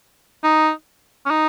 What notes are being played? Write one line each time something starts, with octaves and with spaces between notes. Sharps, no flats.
D#4
C#4
D#4